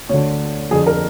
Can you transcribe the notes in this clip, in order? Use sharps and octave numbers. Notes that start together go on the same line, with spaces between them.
D2 D3 C#5
F2 D3 G#4
A#4